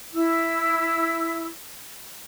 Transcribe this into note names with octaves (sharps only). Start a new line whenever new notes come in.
E4 E6